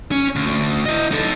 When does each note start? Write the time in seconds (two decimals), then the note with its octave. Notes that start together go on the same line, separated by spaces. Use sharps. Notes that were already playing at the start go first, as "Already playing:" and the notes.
0.11 C#4
0.36 D2
0.86 E4 D#5
1.11 D#4 A4